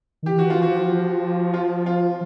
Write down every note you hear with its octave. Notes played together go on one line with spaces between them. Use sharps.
D#3
E3 G4
F#4
F4
F3 F#4
F4
F4